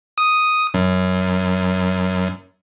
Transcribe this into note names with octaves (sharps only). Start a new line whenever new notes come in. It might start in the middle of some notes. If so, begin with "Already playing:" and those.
D#6
F#2